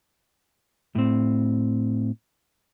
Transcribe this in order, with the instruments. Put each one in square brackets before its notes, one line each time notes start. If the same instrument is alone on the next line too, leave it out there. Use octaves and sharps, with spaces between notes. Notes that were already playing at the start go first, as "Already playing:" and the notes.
[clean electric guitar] A2 C4